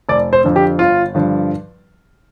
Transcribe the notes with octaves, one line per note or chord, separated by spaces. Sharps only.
F1 D5
C5
F2 D3
G4
G1 F4
G2 D3 F3